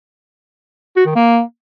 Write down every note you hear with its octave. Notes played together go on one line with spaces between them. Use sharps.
F#4
D#3
A#3